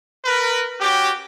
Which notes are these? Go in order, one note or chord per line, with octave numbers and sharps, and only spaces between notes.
A#4 B4
C#4 F#4 G4